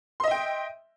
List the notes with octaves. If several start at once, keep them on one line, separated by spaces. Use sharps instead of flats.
D#5 E5 G5 C6